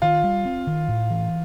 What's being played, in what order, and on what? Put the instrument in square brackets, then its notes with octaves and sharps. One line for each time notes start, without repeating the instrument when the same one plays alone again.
[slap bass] D#3 [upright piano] F4
[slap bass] G3
C4
D#3
A2
E3